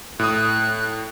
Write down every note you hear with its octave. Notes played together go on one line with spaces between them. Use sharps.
A2 D#6 F#6